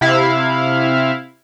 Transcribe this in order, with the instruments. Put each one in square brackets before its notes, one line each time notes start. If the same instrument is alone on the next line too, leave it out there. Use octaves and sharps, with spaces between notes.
[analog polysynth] C3 E4 F5